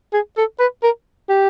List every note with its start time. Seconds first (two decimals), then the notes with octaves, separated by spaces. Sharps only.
0.13 G#4
0.37 A4
0.60 B4
0.83 A#4
1.29 G4